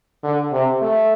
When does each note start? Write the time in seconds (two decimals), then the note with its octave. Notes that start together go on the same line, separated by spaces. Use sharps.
0.23 D3
0.52 C3
0.81 A3